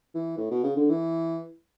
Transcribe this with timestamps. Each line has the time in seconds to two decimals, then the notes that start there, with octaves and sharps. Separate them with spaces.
0.15 E3
0.38 A2
0.51 B2
0.63 C#3
0.77 D3
0.90 E3